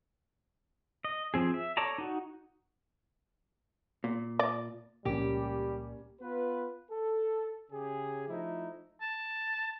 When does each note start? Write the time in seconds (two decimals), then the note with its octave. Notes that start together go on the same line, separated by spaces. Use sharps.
1.04 D#5
1.34 F3 C4 G#4
1.54 E5
1.77 A4 C#5 D5 A5 A#5
1.98 D#4 F#4
4.04 A#2
4.39 D5
5.05 C#2 A#2 F3 G3 A#3 C#4 G4
6.22 B3 F4 B4
6.91 A4
7.71 C#3 G4 G#4
8.29 F3 A3 D#4 E4
9.01 A5